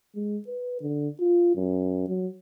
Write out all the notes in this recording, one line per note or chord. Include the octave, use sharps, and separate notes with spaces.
G#3
B4
D3
F4
F#2
F#3